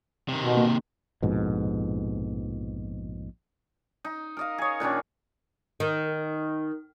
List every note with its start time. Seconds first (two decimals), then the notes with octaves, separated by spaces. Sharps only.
0.29 C3 D#3
0.42 B2
0.57 A#3
1.23 A#1 F2 G#2 B2
4.05 D#4
4.37 A#4 D#5 F5
4.58 G#4 C#5
4.80 A#2 D#3 C#4 D4
5.80 D#3